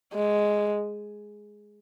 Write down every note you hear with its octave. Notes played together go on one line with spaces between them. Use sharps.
G#3